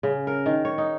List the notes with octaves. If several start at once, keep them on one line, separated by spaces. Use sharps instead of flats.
C#3
A#4
D#3
C#5
D#4